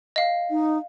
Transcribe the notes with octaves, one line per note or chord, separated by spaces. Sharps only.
D#5 F5
D#4